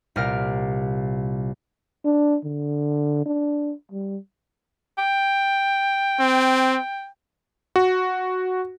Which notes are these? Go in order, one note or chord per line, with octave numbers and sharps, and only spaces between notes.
C2 A#2 G3 A#4 F6 D7
D4
D3
D4
G3
G5
C4
F#4